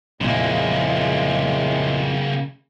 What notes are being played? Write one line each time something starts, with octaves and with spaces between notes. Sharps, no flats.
A#1 F2 A2 C#3 G#3 A#3 C6